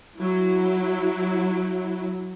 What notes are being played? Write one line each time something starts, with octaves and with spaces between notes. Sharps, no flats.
F#3 E4